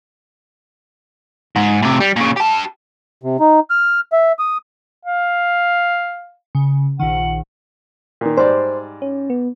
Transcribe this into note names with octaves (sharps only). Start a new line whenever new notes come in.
G#2
A2 C3
G3
A#2 C#3
G4 A5
C3
D#4
F6
E5
D#6
F5
C#3
A#1 D#3 F#5
A#2 D#3
G#2 G3 C5 D5
C#4
B3